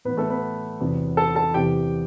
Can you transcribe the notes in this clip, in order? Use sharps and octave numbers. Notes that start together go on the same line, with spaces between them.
A2 E3 B3 B4
A3 A4
B3 B4
E2 C3 F#3
A4 A5
A4 A5
E2 C3 E3 G4 G5